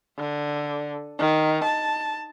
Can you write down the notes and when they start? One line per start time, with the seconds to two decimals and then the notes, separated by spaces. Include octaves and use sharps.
0.18 D3
1.19 D#3
1.64 A5